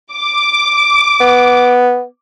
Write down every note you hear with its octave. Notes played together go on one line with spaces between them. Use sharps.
D6
B3